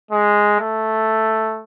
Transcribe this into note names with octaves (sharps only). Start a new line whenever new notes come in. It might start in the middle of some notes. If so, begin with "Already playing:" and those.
G#3
A3